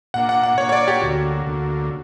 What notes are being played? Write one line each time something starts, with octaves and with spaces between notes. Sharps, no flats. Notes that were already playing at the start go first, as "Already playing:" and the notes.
A#2 A#3 D4 F#5
F#5
F#5
A#2 A#3 D4 C#5
C#5
D5
G4
D2 D3 A#3 F#4
D2 D3 A#3